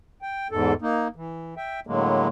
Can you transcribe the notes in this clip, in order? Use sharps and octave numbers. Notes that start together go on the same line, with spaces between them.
G5
E2 G#2 A4
A#3 D#4
E3
E5 G5
A2 D3 F#3 G#3 A#3